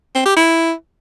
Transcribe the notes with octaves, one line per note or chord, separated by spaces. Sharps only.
C4
G4
E4